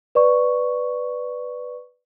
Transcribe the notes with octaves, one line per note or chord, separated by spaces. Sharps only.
B4 D5 C#6